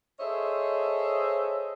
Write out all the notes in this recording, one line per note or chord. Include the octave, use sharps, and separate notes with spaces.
G#4 A4 C5 C#5 D#5 E5